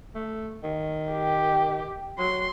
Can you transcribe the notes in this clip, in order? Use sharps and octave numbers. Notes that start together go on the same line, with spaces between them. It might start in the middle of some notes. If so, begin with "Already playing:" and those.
A3
D#3
G4
F#3 C6